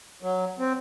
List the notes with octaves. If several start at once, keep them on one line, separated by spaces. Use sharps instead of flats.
F#3
C4